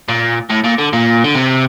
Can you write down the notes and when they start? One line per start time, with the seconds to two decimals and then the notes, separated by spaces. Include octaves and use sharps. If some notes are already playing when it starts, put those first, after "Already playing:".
0.08 A#2
0.50 A2
0.64 A#2
0.78 D3
0.93 A#2
1.24 D3
1.35 C3